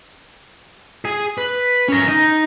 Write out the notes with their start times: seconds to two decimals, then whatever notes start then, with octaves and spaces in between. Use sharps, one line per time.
1.05 G#4 G#5
1.38 B4
1.88 C#4 A#4
2.08 D#4